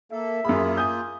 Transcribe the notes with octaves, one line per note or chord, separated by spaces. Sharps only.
A#3 A4 E5
F#2 A#3 F4 G#4 B5
G#5 D#6 G6